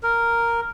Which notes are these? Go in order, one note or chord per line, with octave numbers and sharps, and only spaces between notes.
A#4